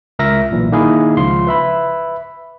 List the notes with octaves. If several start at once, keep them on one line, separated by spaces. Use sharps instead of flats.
C#2 A#4 E5 A#6
B1 A#2 E3
D#3 A#3 D#4 E4 G#4 A#4
C#2 C#3 F3 F4 C6
B4 E5 B5